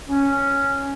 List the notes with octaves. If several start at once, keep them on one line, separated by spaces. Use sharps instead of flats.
C#4